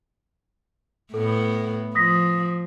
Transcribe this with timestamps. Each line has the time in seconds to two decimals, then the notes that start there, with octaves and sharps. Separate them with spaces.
1.14 A2 B3 A4
1.95 F3 D#6 A#6 B6